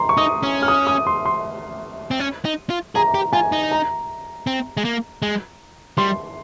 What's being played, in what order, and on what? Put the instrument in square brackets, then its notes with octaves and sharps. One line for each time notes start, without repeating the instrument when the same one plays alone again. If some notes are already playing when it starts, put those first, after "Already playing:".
Already playing: [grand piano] A#5 C6
C#6
[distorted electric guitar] D#4 [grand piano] D#6
[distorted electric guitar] C#4
[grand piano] F6
D#6
D#6
C6
C6
[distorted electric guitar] C4
C#4
D#4
F4
[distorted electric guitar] G#4 [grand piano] A#5
[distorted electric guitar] G4
[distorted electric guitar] F4 [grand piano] G#5
[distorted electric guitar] D#4
[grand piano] A#5
[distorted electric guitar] C4
G#3
A#3
G#3
[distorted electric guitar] G3 [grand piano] C6